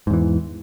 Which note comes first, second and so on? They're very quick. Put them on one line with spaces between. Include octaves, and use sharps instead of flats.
G#2 E2 E3